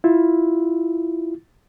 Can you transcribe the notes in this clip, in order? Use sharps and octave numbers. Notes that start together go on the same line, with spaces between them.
E4 F4